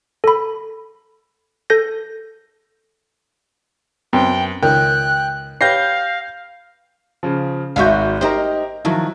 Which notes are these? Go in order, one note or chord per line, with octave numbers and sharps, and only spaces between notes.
A4 B5
A4 G6 A#6
F#2 B3 C4 G5
C#2 D#3 A#4 G5 F#6
G4 B4 C#5 F5 G6 A#6 C7
C#3 F3
G#1 G#2 F#4 E5 F5 G6
D#4 G4 A#4 C5
D#3 F3 F#3 E4